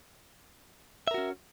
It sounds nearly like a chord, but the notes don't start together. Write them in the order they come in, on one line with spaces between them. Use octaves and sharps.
E5 A#4 F#4 C#4